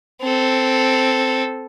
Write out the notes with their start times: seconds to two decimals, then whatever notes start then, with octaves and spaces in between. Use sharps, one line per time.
0.22 C4 A4